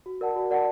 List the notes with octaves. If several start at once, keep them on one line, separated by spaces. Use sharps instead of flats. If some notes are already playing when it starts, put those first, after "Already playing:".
F#4
A#4 D5 F#5 A5
F#4
A#4 D5 F#5 A5